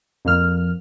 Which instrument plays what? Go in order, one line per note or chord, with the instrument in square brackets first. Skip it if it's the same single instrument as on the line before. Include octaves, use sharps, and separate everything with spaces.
[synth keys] F2 A#3 F6